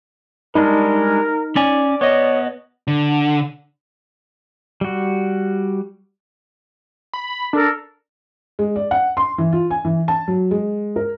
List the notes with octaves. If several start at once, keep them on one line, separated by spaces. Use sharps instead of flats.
G3 G#3 D4 D#4 A#4
C#4 D5 G#5
B3 C#5 D#5
D3
G3 F#4
B5
D4 A4 A#4
G#3
D5
F#5
C6
E3
F4
G#5
E3
A5
F#3
G#3
A#4